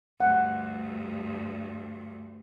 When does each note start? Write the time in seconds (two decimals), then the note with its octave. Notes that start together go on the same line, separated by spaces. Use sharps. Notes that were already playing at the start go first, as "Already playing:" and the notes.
0.20 D2 G2 F#5